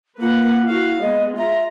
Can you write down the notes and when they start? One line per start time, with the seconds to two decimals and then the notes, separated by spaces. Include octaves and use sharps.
0.21 A#3 F4 B4 F#5
0.67 E4 F#4 F5
1.01 G#3 B3 D#5
1.37 F4 E5 A#5